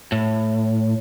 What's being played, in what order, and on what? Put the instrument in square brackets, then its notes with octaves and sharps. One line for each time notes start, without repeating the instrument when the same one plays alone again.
[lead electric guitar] A2